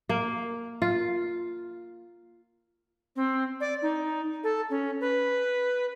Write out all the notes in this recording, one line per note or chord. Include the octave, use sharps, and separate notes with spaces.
A#3
F4
C4
D5
D#4
A4
C#4
B4